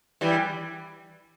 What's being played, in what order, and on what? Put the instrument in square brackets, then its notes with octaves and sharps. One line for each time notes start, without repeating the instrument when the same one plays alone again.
[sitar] E3 G3